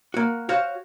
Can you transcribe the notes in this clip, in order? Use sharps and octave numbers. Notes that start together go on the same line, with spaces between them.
A#3 F#4
F#4 C5 C#5 F5